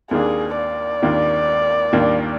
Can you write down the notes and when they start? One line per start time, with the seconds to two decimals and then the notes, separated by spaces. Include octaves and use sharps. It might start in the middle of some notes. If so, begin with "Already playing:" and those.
0.11 D#2 D#3 A#3 D4 G#4
0.57 D5
1.02 D#2 D#3 A#3 D4
1.93 D#2 D#3 A#3 D4